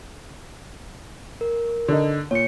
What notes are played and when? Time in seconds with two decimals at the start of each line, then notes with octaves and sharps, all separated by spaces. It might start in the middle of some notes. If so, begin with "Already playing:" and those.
1.41 A#4
1.88 D3 D#4
2.31 A#2 C#5 C#7